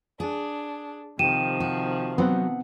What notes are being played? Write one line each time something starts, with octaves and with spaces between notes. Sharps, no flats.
D4 G#4
C3 D#3 F3 G4 G5 D#7 E7
F#4
F#3 B3 C4 F#5